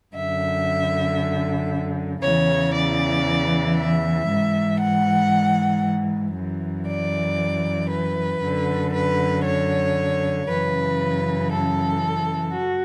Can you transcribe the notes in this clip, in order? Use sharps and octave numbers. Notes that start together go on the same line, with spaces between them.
F#2 D3 E5
E2 C#3 E3 C#5
D5
E5
G#2 E3
F#5
F#2
E3
D5
B4
F#2 D3
B4
C#5
F#2 C#3 E3 B4
A4
F#4